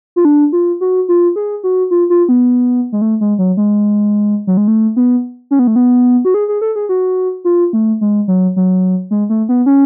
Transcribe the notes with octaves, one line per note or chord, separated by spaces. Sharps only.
F4
D4
F4
F#4
F4
G#4
F#4
F4
F4
B3
G#3
A3
G#3
F#3
G#3
F#3
G#3
A3
B3
C#4
B3
A3
B3
F#4
G#4
G#4
A4
G#4
F#4
F4
A3
G#3
F#3
F#3
G#3
A3
B3
C#4